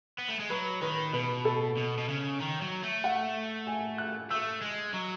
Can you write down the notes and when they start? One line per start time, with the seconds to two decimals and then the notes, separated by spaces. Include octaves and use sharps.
0.18 B3
0.28 A3
0.39 G#3
0.50 F#3 B4
0.82 D#3 B4
1.13 B2 B4
1.45 A4
1.77 B2
1.98 B2
2.09 C#3
2.40 D#3
2.61 F#3
2.83 A3
3.04 F#5
3.67 G#5
3.98 F#6
4.30 A3 E6
4.62 G#3
4.93 F#3